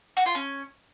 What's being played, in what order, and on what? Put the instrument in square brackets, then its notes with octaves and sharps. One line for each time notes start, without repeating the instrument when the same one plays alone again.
[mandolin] F#4
F4
C#4